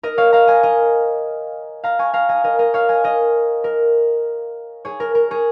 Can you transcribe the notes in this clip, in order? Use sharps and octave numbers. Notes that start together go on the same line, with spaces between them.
A#4 D#5
C#5 F5
F5 A#5
D#5 G#5
A#4 D#5
F5 A#5
G#5 C#6
F5 A#5
D#5 G#5
A#4 D#5
A#4 D#5
C#5 F5
D#5 G#5
A#4 D#5
A#4
G#4 C#5
A#4
A#4
G#4 C#5